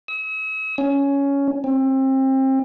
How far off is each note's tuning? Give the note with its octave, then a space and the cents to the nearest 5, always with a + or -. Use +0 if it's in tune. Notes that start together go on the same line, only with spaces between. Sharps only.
E6 -45
C#4 +10
C4 +30